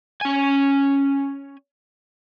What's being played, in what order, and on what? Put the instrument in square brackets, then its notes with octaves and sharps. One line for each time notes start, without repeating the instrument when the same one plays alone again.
[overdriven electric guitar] C#4 G#5